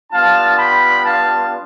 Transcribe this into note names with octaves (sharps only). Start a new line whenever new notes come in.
G3 B3 D4 F4 F5 A5
G5 B5
F5 A5